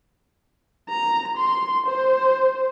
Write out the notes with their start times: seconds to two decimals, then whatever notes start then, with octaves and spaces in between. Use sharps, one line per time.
0.89 A#5
1.37 C6
1.86 C5